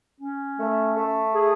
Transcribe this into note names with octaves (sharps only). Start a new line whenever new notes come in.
C#4
A3
A3
G#4